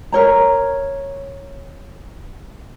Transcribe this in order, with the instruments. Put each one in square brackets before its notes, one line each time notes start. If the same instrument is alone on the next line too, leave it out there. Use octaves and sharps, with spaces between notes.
[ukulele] A#4 C#5 A#5